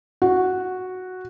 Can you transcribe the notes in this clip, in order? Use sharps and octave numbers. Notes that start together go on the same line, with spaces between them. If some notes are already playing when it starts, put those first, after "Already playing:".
F#4